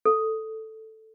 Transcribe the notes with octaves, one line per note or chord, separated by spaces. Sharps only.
A4